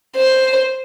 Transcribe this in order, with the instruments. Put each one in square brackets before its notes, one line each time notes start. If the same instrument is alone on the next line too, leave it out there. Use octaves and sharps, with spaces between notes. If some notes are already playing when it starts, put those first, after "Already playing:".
[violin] C5